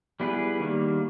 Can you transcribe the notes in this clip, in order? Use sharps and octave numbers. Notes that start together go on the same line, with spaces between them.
G3 B3 E4 G#4 B4
D#3 G3 A#3